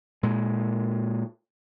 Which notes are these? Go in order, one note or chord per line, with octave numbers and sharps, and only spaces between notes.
A#2 G#3